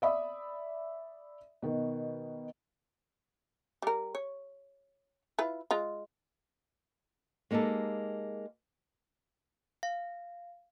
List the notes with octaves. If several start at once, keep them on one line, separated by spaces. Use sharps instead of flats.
D5 E5 B5 D#6
B2 D#3
G3 A#4
C#5
E4 F4 B4
G#3 F4
G#3 A#3 D#4 G4 A4
F5